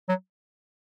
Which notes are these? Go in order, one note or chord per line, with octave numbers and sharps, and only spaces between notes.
F#3